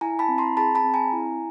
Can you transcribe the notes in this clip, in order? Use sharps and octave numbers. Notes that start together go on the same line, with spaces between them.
E4 G#5 A#5
A5 B5
C4
A#5 C6
G#4 A5 B5
A5 B5
C4
G#5 A#5
E4